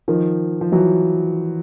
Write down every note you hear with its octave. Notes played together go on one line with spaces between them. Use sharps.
D#3 F3
F3
E3 F#3